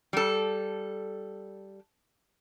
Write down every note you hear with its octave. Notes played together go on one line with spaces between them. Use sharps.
G3 A4